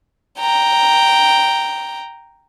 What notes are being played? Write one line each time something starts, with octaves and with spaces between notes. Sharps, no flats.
G5 A#5